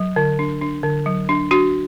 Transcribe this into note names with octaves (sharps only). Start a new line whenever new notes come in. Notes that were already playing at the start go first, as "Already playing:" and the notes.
Already playing: F#3
D3
D4
D4
D3
F#3
D4
D4 F#4